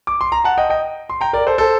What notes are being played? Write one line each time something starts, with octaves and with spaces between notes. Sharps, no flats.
D6
C6
A#5
F#5 A5
D#5 G5
D#5 G5
C6
G5 A#5
A#4 D5
A4 C5
A4 C5